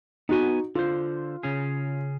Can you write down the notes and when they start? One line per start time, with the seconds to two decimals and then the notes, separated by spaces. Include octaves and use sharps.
0.29 B3 D#4 F#4 B4 G#5
0.75 D3 F4 C5
1.43 C#3 C#4 G#4